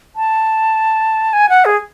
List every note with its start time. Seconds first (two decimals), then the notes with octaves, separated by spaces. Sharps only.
0.16 A5
1.33 G#5
1.49 F#5
1.65 G#4